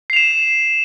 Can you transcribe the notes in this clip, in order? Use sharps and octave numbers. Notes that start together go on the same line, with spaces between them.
C7 E7 F7